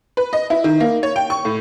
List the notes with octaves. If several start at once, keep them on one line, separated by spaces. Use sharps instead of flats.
B4
D#5
E4
D#3
A#3
C#5
G5
C#6
A2